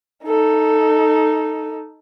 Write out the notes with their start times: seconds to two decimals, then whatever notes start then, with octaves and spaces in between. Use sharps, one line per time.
0.24 D#4 A4